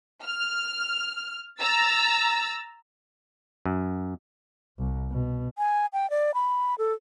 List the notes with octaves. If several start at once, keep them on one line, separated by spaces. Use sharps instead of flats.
F6
A#5 E6 A6
F#2
C2
B2
G#5
G5
D5
B5
A4